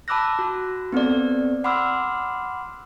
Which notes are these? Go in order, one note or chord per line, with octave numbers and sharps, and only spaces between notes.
A5 B5 D6 E6 F#6 A#6
F#4
B3 C4 A4 D5
F#5 B5 C6 D6 E6 F6